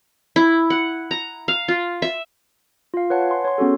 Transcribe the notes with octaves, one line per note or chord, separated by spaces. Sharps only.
E4
F#5
A#5
F5
F4
E5
F4 F5
B4 C#5 F#5 A5
F#5 G#5 C6
C#5 C6
B3 C#4 F#4 G#4 A4